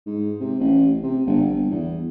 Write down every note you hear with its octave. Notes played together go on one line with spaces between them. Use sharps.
G#2
C3
A1
C3
G1
G1
E2